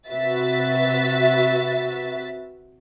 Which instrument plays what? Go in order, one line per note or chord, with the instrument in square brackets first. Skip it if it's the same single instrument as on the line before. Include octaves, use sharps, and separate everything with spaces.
[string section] C3 F#4 B4 E5 A6